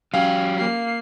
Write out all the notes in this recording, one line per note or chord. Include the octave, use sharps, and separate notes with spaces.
F#3 C#4 G4 F5
A#3 C7